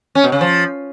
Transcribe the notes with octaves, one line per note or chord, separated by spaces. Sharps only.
C#4
B2
C#3
F3